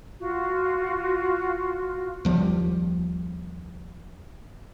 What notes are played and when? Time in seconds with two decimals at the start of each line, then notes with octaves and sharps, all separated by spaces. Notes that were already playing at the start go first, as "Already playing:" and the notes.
0.20 F4 F#4
2.25 D#2 F3 G3